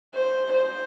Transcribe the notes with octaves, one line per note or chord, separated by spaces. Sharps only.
C5
C5